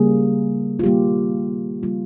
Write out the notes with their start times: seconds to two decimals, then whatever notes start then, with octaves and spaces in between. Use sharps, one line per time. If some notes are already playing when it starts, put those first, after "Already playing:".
Already playing: C#3 G3 A#3 G#4
0.79 F4
0.84 D#3 G3 A#3 G4
1.83 C#3 G3 A#3 F4